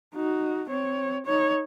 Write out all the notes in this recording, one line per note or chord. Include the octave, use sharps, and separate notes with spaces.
D#4 F#4
C4 C#5
D#4 C#5